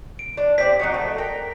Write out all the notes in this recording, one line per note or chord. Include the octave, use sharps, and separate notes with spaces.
D7
D4
C4 G4 D5 B6
F#3 D#4 F#4
A3
A#4 G5